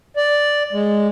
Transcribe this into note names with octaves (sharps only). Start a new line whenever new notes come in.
D5
G#3